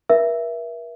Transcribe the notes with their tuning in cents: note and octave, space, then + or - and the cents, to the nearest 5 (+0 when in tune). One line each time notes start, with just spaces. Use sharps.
A#4 +45 E5 +10